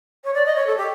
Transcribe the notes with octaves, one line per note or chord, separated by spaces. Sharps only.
C#5
D5
D#5
C#5
A4
G4